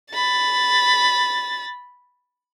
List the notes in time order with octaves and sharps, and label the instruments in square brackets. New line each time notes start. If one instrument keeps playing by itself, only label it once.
[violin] B5 A6